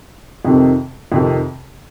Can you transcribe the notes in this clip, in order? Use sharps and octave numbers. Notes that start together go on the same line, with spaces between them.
F2 C3 D#3
F2 C3 D#3